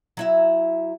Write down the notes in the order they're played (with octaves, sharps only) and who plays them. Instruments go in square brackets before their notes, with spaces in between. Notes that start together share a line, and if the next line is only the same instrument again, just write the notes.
[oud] F#3 E4 E5